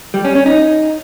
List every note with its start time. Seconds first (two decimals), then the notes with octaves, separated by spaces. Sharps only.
0.14 G3
0.25 C#4
0.35 C#4
0.46 D#4